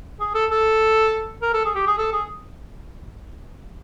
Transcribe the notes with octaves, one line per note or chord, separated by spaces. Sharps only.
G#4
A4
A4
A#4
A4
G#4
G4
G#4
A4
G#4